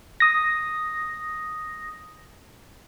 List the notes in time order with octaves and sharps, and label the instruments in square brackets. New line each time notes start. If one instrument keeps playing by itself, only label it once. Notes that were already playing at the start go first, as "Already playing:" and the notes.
[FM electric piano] D#6 A#6